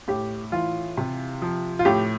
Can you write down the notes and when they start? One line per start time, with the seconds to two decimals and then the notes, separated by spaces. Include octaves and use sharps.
0.08 A2 G4
0.52 E3 F4
0.97 C3
1.42 F3
1.79 F4
1.85 A2 G4